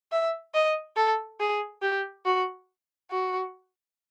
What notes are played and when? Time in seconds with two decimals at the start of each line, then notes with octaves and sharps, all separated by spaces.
0.12 E5
0.54 D#5
0.96 A4
1.40 G#4
1.82 G4
2.25 F#4
3.10 F#4